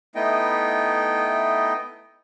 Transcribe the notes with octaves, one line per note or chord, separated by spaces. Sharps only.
A3 B3 D#4 E4 D#5 G5